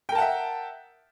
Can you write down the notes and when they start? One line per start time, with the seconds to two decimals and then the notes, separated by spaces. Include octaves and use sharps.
0.09 G5
0.12 A#4
0.15 A5
0.18 F#5
0.21 E5